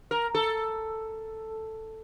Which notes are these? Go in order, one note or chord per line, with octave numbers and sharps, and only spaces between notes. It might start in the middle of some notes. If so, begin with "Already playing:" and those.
A#4
A4